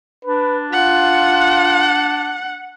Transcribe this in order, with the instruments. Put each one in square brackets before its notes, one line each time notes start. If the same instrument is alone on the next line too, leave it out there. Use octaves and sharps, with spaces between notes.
[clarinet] D4 [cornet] B4
[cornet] F4 [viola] F#5